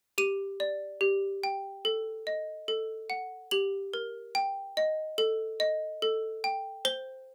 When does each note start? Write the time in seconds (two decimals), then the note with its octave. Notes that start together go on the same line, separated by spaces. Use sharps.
0.18 G4 D#7
0.60 D5
1.01 G4
1.44 G5
1.85 A4
2.27 D#5
2.68 A4
3.10 F#5
3.51 G4 F#7
3.94 A#4
4.35 G5
4.77 D#5
5.18 A4
5.60 D#5
6.02 A4
6.44 G5
6.85 C5 G7